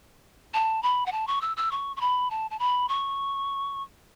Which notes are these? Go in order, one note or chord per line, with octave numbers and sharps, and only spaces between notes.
A5
B5
F#5
A5
C#6
E6
E6
C#6
C#6
B5
A5
A5
B5
C#6